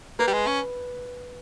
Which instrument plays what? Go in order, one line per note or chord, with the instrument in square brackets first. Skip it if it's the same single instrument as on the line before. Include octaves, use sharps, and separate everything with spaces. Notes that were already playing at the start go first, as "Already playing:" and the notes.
[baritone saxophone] A#3 [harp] B4
[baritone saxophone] G3
G#3
C#4